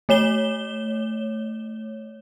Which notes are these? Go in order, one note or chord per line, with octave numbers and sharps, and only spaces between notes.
A3 C#5 E7 G7